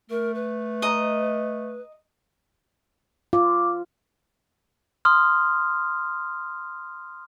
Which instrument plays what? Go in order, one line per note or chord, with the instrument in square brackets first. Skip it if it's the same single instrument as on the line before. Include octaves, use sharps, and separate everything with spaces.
[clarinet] A3 [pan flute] A#4
[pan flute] B4
[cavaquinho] D#5 A#5
[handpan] F4 [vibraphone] D6
[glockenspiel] C6 D#6 F6